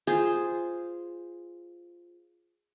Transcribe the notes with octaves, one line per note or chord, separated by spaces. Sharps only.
F4 G#4 C5